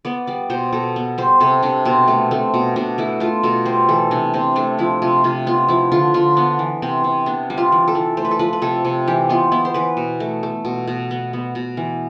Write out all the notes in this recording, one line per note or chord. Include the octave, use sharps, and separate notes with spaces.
B3 D5
G3 D5
B2 C5
B2 A4
B3
G3 C5
C3 A4
C3 D4
B2 C4
A3
A3 C4
B2
B2 D4
A3 E4
A3 F4
B2 A4
G3 C5
E3 A4
C3 D4
C3 C4
A3 D4
F3 E4
C3 F4
C3 F4
B3 F4
F3 E4
D3 F4
D3 F4
B3 D4
E3
C3 C4
C3
B3 D4
G3
F4
E3
A4
E3
A3 C5
B4
A4
F3 B4
B4
C3 A4
C3
E3 G4
B3 F4
B3 E4
C5
E3 B4
B2
A3
A3
B2
B2
B3
B3
B2
E3